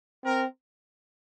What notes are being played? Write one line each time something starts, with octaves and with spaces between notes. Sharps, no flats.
C4 A#4